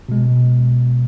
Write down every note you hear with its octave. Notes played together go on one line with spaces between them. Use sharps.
B2 G#3